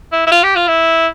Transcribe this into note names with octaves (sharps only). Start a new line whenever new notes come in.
E4
E4
F4
G4
F4
E4